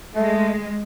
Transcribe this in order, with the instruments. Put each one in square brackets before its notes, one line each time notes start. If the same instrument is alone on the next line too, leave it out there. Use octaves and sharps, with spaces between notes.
[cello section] G#3 [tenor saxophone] A3